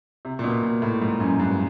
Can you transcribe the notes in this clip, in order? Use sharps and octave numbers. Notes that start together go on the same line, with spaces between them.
C3
A#2
B2
A#2
A2
G#2
F#2
G2